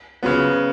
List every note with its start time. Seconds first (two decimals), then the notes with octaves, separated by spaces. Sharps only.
0.23 C#3 F#3 B3